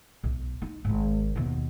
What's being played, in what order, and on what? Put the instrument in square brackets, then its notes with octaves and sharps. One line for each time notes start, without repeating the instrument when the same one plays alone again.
[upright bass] B1
D#4
G#1 G#2
D#2 B2